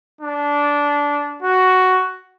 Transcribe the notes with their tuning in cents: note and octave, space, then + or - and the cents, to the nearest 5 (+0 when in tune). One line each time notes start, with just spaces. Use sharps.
D4 -15
F#4 +5